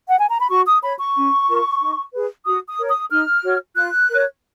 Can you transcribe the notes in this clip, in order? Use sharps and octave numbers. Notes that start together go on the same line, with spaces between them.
F#5
G#5
A#5
B5
F#4 C#6
D#6
C#5 B5
C#6
C#4
F4 A#4
D#4
G#4 B4
F#4 D#6
D#6
A#4 C#5
D#6
D#4 F6
F#4 C#5
F4 F#6
A#4 C#5